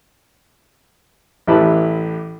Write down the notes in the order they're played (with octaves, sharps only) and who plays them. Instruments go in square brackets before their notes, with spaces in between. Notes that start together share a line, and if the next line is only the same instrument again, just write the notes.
[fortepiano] A1 E4 G4 B4 A5